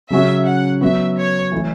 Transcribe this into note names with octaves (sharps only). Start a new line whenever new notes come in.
C#3 F#3 C#4 F#4 E5
F#5
F#3 B3 F#4 E5
C#5
E3 A3 E4